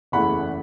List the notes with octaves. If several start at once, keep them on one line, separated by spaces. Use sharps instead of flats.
F#1 E2 E3 A3 F#5 B5